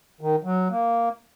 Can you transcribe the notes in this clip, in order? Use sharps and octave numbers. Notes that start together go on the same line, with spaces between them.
D#3
F#3
A#3